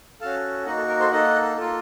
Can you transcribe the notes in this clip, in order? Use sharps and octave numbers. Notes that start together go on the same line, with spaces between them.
C#4 F#4 A4 F5 A5
A#3 D#4 F#4 D#5 F#5
A4
A#4
A4 C5
A#3 D#4 A4 D#5 F#5
A#3 F4 A4